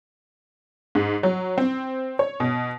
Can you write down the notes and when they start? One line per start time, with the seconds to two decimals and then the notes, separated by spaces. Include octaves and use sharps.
0.95 G#2
1.23 F#3
1.58 C4
2.19 C#5
2.40 B2